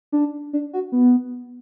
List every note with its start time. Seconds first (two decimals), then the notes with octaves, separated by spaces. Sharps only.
0.12 D4
0.53 D4
0.73 F#4
0.92 B3